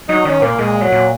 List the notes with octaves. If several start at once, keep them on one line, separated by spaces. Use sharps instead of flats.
F#3 D#4
D#3 C#4
A#2 A#3
A#2 G#3
F#3
A#2